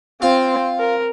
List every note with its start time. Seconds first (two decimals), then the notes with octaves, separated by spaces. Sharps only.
0.22 C4 F4
0.79 A#4